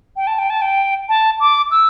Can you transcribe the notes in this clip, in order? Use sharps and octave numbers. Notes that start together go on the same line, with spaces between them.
G5
A5
G5
A5
G5
A5
D6
E6